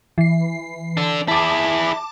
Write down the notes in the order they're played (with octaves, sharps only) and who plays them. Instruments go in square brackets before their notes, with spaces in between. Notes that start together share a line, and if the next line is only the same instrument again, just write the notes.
[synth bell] E3 C7
[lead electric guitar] D4 A4
[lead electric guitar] E4 G#4 [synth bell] A5 D6